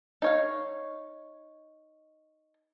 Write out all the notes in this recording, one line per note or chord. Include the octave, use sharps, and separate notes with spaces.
D#4 C#5 F5